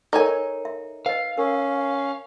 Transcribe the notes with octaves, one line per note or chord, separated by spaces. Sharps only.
D#4 A4 A#4 C#5 G#5
E5
B4 D#5 F5
C#4 A#4